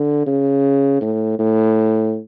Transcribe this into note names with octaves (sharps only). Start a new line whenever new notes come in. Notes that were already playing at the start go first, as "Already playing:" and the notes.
Already playing: D3
C#3
A2
A2